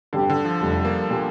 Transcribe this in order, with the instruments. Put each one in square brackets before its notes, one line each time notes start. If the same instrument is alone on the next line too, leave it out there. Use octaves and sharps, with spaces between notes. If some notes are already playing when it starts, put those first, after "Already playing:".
[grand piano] G2 G3 C4 G4 [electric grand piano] D3
[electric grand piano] D3
F3
[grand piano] F1 F2 D3 [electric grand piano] G3
[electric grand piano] A#3
[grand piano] A#2 G3